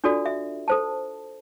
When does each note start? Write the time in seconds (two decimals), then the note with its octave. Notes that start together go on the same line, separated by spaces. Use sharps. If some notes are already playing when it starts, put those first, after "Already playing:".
0.04 D4 F4 F#4 A4 D5
0.26 E5
0.68 A4 C5 A5